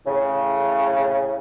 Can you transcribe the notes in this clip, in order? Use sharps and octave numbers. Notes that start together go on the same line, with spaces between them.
A2 C#3